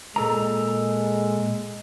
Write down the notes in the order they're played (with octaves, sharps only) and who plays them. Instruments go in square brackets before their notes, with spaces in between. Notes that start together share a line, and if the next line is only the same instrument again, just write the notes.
[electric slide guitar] A#2 A4 A#5 [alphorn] G#3